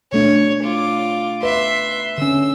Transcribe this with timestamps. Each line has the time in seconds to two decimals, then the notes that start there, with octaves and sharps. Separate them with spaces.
0.13 B2 A3 D4 C#5
0.64 F4 D6
1.43 B4 E5 C6
2.18 D3 C#4 E6